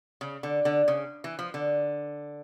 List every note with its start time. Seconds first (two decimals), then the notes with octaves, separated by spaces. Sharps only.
0.21 C#3
0.43 D3
0.65 D3
0.88 C#3
1.24 E3
1.39 F3
1.54 D3